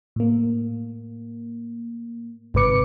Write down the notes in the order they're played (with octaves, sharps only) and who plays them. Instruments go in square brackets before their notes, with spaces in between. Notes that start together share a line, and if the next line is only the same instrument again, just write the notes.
[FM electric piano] A2 A#3
G1 G#2 C3 B4 D6 C#7